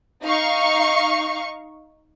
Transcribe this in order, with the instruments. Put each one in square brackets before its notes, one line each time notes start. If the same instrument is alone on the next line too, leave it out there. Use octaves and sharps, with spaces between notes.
[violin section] D#4 F5 C#6